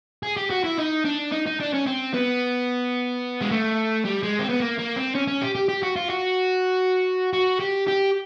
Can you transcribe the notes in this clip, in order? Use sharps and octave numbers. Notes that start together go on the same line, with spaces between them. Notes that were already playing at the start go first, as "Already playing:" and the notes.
G#4
G4
F#4
E4
D#4
D4
D#4
D#4
D4
C#4
C4
B3
G#3
A3
G3
G#3
C4
B3
A#3
A#3
C4
C#4
C#4
G4
G4
G4
F#4
F4
F#4
F#4
G4
G4